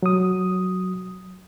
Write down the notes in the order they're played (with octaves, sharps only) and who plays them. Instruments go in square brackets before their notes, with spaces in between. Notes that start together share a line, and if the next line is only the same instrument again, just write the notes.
[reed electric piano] F#3 D#6